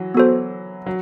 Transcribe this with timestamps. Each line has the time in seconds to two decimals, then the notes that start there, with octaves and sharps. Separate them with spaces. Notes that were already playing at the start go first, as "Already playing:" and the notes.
Already playing: E3 F#3
0.15 B3 F#4 A4 C5
0.86 F#3